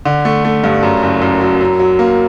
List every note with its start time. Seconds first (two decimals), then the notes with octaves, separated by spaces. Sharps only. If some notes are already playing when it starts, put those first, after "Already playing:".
0.05 D3
0.25 A3
0.45 A3
0.64 G2
0.83 F#2
1.03 F#1
1.22 F#2
1.40 F#3
1.61 F#2
1.79 F#3
1.99 A#3